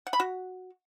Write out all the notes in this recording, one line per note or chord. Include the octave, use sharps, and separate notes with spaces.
F#5
B5
F#4